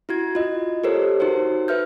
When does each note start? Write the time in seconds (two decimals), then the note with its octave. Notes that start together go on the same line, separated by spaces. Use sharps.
0.09 E4 F#4 G#6
0.35 F4 D#5
0.84 G4 A4 A#4 C5 C#5
1.20 D#4 F#4 C5
1.68 B4 E5 F6 G6